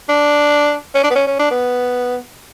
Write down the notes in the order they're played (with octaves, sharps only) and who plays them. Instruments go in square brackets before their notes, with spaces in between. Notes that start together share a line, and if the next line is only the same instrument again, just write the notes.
[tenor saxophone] D4
C#4
D4
B3
C#4
C#4
D4
B3